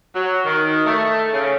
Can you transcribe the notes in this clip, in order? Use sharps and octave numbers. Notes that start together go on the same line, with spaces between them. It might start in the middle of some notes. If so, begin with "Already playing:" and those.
F#3
D#3
A3
C#3